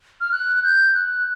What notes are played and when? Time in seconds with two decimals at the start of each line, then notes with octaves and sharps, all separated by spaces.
0.21 F6
0.32 F#6
0.63 G6
0.94 F#6